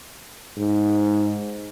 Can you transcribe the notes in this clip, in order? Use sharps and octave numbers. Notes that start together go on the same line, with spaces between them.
G#2